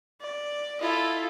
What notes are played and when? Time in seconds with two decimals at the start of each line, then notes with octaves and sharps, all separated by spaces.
0.21 D5
0.81 E4 F4 A4 D#5